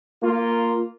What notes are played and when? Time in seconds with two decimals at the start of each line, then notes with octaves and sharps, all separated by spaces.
0.22 A#3 F4